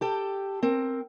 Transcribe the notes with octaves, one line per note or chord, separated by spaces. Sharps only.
G4 A4 G5
C4 A#4